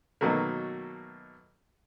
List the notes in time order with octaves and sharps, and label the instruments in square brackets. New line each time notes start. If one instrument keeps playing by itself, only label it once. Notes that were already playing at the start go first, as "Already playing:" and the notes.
[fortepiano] B2 D#3 F#3 A3 A#3